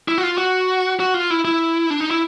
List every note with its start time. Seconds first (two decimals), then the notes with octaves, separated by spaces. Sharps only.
0.08 E4
0.18 F#4
0.23 F4
0.38 F#4
1.00 F#4
1.14 F4
1.30 E4
1.45 E4
1.90 D4
2.00 D#4
2.11 E4